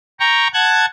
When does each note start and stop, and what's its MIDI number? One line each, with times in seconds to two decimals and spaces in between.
0.20 0.48 79
0.20 0.48 82
0.20 0.48 85
0.54 0.86 78
0.54 0.86 81
0.54 0.86 90
0.54 0.86 92